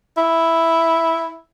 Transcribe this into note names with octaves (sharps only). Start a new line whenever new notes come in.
E4